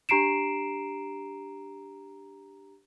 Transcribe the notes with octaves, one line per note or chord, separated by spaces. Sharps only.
D4 G4 A#5 C7 D7 E7